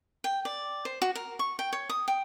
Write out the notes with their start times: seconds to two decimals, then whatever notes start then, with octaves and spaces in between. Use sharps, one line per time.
0.24 G5
0.45 D5
0.85 C5
1.02 F#4
1.15 A#4
1.39 C#6
1.59 G5
1.73 C#5
1.89 D#6
2.08 G5